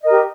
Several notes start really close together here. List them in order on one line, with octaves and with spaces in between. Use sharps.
D#5 A#4 G4